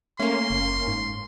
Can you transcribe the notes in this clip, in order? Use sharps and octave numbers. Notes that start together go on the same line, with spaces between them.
A3 A#3 C#4 C6
F#1
G#2